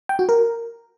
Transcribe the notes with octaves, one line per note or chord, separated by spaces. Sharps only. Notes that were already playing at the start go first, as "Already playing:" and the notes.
G5
F#4
A#4